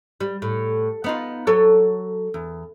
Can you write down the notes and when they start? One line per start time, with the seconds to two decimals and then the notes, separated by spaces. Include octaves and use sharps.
0.20 G3
0.42 A2
1.04 B3 D#4 F4
1.47 F#3 A4 C#5
2.34 E2